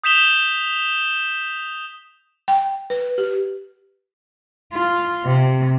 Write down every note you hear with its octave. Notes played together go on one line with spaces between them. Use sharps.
D#6 G6 B6 E7 F7 G7
G5
B4
G4
F4
C3